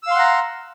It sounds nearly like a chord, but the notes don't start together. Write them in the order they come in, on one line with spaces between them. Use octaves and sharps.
E6 F5 C6 F#5 A#5